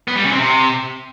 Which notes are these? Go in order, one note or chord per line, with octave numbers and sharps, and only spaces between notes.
B3
G3
C#3
C4
C3